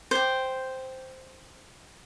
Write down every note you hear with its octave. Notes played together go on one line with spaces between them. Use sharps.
C5 G5